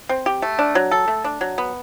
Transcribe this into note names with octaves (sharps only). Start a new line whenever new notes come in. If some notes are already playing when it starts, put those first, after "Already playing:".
C4
G4
A3
D4
F#3
A4
A3
D4
F#3
B3